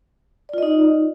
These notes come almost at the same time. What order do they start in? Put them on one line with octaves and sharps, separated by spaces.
D5 F4 D#5 D#4